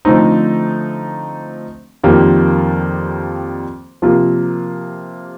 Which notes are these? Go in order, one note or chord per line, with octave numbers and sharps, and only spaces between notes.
D3 F3 A3 C4 D#4
F2 D#3 G3 A#3 F4
C3 F3 A#3 F4